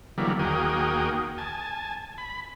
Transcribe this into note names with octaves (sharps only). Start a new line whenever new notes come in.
D3 E3 F#3 G3 A#3 B3
D#2 A#3 F#4 G#4 G5 D#6
G#5 A5
B5